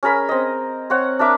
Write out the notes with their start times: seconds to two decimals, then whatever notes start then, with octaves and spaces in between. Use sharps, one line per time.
0.03 C#4 G#4 A#4 B5
0.29 C4 D#5
0.90 C4 C#5 F#5
1.19 D4 A#4 E5 D6